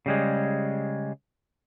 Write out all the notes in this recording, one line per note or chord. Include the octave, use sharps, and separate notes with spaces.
C#3 G3 G#3